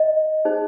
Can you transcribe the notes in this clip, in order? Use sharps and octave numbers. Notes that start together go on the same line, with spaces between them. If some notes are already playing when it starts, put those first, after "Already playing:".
Already playing: D#5
D#4 G#4 C5